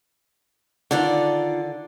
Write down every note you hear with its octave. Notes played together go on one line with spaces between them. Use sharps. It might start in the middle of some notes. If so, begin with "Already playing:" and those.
D3 D#3 F4 D5